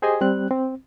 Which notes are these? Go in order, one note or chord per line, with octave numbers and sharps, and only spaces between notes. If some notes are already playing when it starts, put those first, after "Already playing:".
G4 G#4 C5 D#5 G#5
G3 C4 F#6
C4